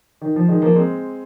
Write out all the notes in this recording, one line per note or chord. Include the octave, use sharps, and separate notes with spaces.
D#3
F3
D#3 G#3
F3 A#3
G#3 C4